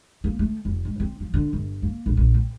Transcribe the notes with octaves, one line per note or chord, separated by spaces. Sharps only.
A#3
A3
F1
G#2
C4
F3
D3
G1
A#3
A#1
A#1
C4